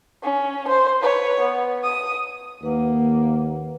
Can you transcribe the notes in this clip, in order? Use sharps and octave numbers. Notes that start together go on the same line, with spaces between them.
C#4
C5
B4 C#5
B3
D#6
D#2 A#3 B4 F#5